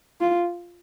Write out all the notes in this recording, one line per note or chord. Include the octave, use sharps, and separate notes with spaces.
F4